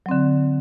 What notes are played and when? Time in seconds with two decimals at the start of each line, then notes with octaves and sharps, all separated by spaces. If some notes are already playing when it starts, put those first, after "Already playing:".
0.06 F#3
0.09 C4
0.11 D3